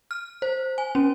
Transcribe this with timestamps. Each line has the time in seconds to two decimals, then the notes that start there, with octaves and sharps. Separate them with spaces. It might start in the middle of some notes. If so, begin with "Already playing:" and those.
0.11 F6
0.42 C5
0.78 G#5
0.95 C#4